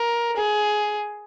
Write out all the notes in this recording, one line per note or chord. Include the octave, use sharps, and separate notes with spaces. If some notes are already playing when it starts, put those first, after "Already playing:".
Already playing: A#4
G#4